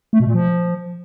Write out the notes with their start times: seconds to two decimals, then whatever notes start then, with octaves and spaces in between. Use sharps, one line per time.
0.13 A3
0.20 B2
0.27 A#2
0.34 F3